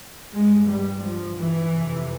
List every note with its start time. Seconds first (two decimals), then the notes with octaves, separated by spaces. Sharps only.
0.32 G2 G#3
0.66 G3
1.01 F3
1.35 E3
1.69 F2 C3